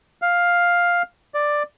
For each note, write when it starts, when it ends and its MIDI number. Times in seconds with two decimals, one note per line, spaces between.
0.22 1.02 77
1.34 1.63 74